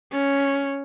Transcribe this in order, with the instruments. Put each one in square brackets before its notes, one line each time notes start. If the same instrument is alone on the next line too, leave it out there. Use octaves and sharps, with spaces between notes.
[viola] C#4